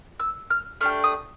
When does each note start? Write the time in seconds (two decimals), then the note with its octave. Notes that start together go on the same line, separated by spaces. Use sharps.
0.20 E6
0.50 F6
0.81 A3 D4 G4 F6
1.04 D#6